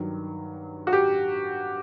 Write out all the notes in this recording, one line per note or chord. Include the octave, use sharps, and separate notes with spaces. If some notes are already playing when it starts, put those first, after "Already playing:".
Already playing: G2 D#3 F#3
F#4
G4